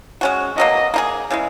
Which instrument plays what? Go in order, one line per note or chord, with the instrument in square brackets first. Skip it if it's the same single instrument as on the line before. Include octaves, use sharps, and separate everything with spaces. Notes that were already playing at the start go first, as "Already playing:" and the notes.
[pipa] G#3 C#4 F#4
[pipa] B2 F#3 A#3 [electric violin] D#5
[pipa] A#3 D#4 G#4
C#3 E3 G#3